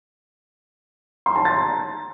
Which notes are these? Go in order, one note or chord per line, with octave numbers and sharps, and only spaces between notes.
C6
A5
A6
A#5